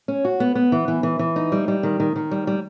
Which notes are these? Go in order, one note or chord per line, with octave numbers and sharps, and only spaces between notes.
C#4
F#4
B3
B3
E3
E3
E3
E3
D#4
G3
G3
D#3
D#3
D#3
G3
G3